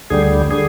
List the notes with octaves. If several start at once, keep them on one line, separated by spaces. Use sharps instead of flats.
D2 D3 G3 G#4
D3 G#4